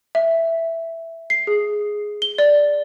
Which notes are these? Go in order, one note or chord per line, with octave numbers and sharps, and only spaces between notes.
E5
C7
G#4
G7
D5